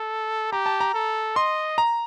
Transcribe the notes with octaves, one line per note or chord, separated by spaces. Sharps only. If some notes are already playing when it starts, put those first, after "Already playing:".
Already playing: A4
G4 A#5
A5
A#5
A4
D#5 C6
A#5